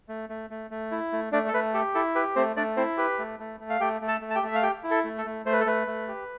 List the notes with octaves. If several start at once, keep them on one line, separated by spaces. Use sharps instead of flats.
A3
A3
A3
A3
E4
A3
A3 D4 D5
A4
A3 B4
G4 A4
E4 A4
G4 B4
A3 C4 C5
A3 D4 D5
C4 E4 C5
G4 B4
A3
A3
A3
F5
A3 G4 G5
A3
A4 A5
A3
A5
G4 G5
A3
E5
F5
G4 G5
E4
A4
A3
A4
A3
A3 C5
B4
A4
A3 B4
A3
G4